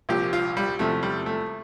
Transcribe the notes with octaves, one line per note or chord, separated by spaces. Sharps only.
C2 A#2 F3 G4
F4
G3
E2 C3 F3 A3
G3
A3